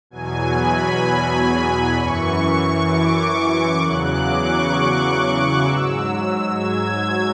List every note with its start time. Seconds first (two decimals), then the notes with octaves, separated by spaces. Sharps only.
0.10 E2 B2 F#3 G#5
0.56 B5
1.95 F#2 E3 C#6
2.87 D6
3.79 E2 C#3 F#3 F#6
4.10 D6
4.40 C#6
4.71 C#6
5.17 C#6
5.63 G#2 F#3 E6
6.54 G#6
7.00 G#6